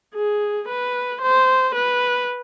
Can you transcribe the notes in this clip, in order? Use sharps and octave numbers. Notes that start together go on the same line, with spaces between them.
G#4
B4
C5
B4